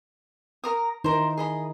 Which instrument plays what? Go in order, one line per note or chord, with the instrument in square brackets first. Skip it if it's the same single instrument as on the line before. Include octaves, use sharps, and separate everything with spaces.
[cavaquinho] A#4 A#5 D#6
[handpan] D#3 D#4 E4 [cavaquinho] A#4 C5
[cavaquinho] G#4 D#5 B5